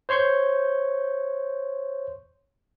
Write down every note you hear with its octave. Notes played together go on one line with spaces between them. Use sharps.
C5 C#5 C6 C#6 G6